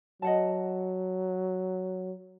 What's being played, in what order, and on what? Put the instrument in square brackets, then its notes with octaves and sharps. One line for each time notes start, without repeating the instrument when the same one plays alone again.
[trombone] F#3 [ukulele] D#5 F#5 A5